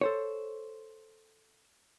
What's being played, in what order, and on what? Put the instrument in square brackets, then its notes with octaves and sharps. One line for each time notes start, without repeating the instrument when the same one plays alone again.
[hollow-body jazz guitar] A4 C5 C#5